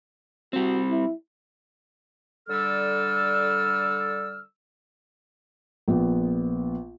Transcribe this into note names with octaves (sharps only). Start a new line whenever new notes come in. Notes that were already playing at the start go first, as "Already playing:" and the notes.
G3 C4 F#4
E4
D3 G3 A4 D5 E6 F6
A#1 B3